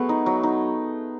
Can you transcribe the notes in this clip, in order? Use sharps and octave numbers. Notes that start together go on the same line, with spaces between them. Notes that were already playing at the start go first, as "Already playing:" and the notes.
Already playing: F#3 A3 B3 G#4
D#4
F#3
D#4